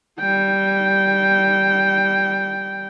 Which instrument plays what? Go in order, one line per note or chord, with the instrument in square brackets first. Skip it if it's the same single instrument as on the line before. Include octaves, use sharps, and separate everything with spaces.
[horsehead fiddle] G3 G5